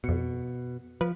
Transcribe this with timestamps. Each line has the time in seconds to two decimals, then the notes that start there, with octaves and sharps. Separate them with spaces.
0.04 F2 B2 C#7
1.01 F3 B4